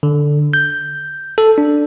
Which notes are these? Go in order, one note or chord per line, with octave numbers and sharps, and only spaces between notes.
D3
G6
A4
D4